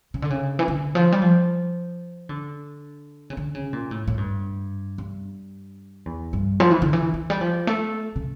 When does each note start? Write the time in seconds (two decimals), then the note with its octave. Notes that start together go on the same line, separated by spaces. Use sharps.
0.14 C#3
0.22 D3
0.30 C#3
0.59 E3
0.68 D3
0.95 F3
1.12 G3
1.22 F3
2.29 D3
3.30 C#3
3.37 D3
3.55 C#3
3.73 A#2
3.91 A2
4.07 A2
4.18 G2
4.98 G2
6.06 E2
6.33 G2
6.60 F3
6.71 E3
6.82 D3
6.93 E3
7.14 E3
7.30 G3
7.41 F3
7.67 A3
8.16 C#3